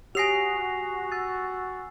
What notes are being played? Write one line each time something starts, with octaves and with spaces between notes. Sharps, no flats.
F#4 G4 G#5 D#6 A#6 C7 F7
E6 A6